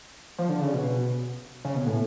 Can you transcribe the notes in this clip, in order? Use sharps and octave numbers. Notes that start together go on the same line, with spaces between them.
F3
D3
C#3
B2
C#3
B2
A2